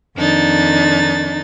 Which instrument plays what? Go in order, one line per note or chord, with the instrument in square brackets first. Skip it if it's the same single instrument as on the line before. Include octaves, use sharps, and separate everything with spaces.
[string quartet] F2 D#3 D4 D#4 A6